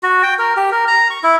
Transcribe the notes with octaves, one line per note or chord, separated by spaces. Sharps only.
F#4
G5
A#4
G4
A#4
A#5
C#6
E4